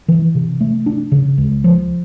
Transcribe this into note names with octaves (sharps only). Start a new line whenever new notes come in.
E3
C3
A3
D4
C#3
C#2
F3